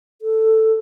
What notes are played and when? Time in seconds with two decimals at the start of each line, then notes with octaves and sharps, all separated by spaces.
0.22 A4